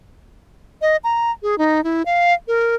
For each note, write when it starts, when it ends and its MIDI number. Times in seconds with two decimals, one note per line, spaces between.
0.82 0.97 75
1.04 1.31 82
1.43 1.58 68
1.58 1.83 63
1.84 2.02 64
2.06 2.33 77
2.48 2.75 70